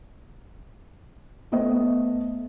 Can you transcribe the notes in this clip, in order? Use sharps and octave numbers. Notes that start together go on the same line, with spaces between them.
A3 B3 C5 D#5